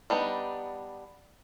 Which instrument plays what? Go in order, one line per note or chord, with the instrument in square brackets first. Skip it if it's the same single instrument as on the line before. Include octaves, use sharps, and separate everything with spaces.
[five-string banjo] G3 B3 D4 D#4